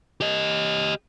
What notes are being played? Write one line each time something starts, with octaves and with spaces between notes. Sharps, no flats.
G4 D#5